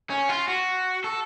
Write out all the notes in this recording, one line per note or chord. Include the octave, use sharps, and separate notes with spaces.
C#4
F4
F#4
A4